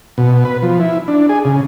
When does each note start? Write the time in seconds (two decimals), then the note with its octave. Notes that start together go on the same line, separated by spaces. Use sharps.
0.18 B2
0.45 B4
0.62 F3
0.80 E4
1.08 D4
1.29 G#4
1.45 C#3